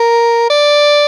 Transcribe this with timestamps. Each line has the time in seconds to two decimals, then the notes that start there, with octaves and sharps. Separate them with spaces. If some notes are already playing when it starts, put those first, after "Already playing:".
Already playing: A#4
0.50 D5